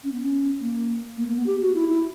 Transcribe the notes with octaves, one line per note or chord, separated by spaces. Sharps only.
C#4
B3
C#4
A#3
A#3
A#3
B3
G4
F#4
E4
E4